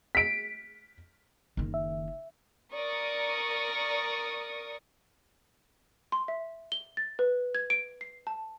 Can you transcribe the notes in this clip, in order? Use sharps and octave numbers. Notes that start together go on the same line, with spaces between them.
B6 D7
F#1 D#3
E5
A#4 D5 C#6 D#6
C6
E5
G7
A6
B4
G#6
D7
C7
A5